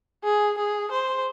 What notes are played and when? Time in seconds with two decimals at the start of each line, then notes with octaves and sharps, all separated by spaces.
0.24 G#4
0.58 G#4
0.91 C5